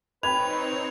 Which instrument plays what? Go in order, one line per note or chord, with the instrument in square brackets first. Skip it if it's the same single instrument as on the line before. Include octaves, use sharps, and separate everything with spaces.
[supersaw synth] C4 D#4 C#5 [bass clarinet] B4 [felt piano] G5 B5 G#6 [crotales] F7